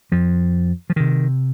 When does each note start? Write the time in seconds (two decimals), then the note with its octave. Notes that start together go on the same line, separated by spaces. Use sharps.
0.12 F2 F3
0.90 F3
0.96 C3 D#3